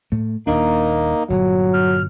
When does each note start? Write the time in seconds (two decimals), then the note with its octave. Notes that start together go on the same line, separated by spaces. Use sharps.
0.12 A2 A3
0.47 D#1 D#2 A#3 D4 D#4
1.30 G1 A#2 F#3
1.74 F6